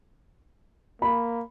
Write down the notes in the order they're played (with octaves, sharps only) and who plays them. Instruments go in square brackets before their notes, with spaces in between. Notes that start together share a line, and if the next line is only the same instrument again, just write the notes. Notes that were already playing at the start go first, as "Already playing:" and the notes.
[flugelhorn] A#3 [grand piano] B5